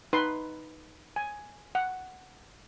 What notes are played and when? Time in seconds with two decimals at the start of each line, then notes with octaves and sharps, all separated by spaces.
0.13 D#4 B4 C6
1.16 G#5
1.75 F#5